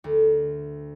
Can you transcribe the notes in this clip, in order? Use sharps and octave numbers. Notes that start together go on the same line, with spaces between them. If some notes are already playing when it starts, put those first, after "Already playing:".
D2